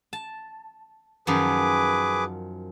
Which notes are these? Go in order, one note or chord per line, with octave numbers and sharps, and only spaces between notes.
A5
F#2 D#3 F3 G#4 B4 D6